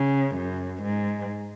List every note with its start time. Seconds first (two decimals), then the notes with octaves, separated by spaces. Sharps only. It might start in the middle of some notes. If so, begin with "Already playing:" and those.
Already playing: C#3
0.36 F#2
0.83 G#2